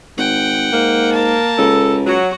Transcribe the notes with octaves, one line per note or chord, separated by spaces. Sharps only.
G#1 F#5 G5
G#2 A#3
A#4 A5
C#2 A4
F#3 F#4